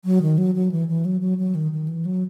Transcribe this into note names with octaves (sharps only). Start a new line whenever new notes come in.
F#3
D#3
F#3
F#3
E3
E3
F#3
F#3
F#3
D#3
D#3
E3
F#3